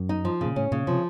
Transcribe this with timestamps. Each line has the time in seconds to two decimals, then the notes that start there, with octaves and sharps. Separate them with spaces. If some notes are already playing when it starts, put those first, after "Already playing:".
Already playing: F#2
0.09 D#4
0.25 F3
0.41 A#2 C#3
0.56 A2 C#4
0.72 A#2 C#3
0.87 C3 F3